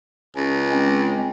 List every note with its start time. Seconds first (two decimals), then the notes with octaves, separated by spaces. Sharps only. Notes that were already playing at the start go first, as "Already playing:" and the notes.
0.36 C#2 C#4
0.72 G#3 C4 C#4